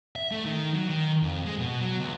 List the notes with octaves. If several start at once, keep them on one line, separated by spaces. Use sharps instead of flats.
E5
A3
D#3
F#3
D#3
F2
G#3
B2
F#3
C#2